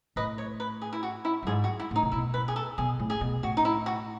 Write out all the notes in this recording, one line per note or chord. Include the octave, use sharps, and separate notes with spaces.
A2 B4 D#5
C#5
B4
G#4
E4
F#4
E4
F#2
G#2 G#4
F#4
E4
A2 D#4
C#3
B2 E4
B4
G#4
A4
B2 G#4
A2
G#4
B2
A2 F#4
D#4
E4
F#4